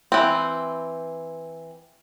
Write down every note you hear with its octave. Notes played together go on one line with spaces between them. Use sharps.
E3 C4